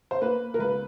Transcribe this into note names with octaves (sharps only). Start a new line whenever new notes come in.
C5
A#3 B4
A#4
C#2 B4